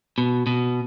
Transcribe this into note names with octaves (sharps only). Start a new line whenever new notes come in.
B2
B2